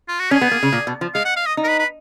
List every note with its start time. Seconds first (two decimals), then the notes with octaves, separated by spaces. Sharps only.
0.08 F4
0.19 F#4
0.31 C#4 G#4
0.41 B3
0.51 A#3
0.63 C#3
0.72 A#2
0.87 B2
1.01 F3
1.15 G#3 F5
1.25 F#5
1.36 F5
1.46 D#5
1.57 D#4
1.64 A#4
1.68 B4
1.79 B4